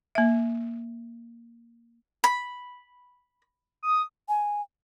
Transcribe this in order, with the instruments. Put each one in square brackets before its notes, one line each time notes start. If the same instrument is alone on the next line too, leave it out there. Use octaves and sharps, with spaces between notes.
[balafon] A#3 E5
[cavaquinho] B5
[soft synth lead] D#6
[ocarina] G#5